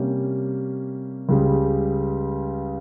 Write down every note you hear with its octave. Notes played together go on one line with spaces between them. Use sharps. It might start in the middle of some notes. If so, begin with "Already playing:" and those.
Already playing: C3 G3 A#3 C#4 G4
C#2 C#3 G3